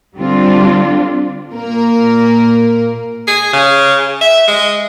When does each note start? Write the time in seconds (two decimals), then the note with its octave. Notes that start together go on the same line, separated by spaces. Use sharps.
0.16 D3 G3 C4 D4 F4
1.52 A#2 A#3 A#4
3.27 G#4
3.53 C#3
4.21 E5
4.48 G#3